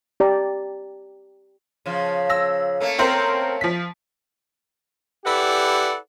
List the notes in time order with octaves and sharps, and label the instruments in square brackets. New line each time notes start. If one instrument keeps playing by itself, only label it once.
[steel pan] G4 D5 A#5
[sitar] C#3 F3
[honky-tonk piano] E6 A#6
[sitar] A3 A#3 C#4
[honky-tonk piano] C4 A#4 C5
F3 B6
[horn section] E4 G4 A4 B4 D5 F#5